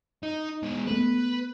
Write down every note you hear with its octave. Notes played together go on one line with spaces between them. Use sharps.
D#4
B2 G#3
A3 B3 B4